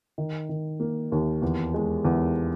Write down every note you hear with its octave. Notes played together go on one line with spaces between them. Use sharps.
D#3
D#3
A#3
D#2
E2
G#3
E2